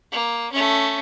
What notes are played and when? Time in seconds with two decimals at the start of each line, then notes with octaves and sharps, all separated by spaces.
0.12 A#3
0.52 A3 C#4